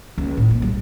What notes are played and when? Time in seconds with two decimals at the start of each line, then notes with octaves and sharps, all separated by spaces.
0.18 C#2
0.37 A2
0.51 A#3
0.62 G3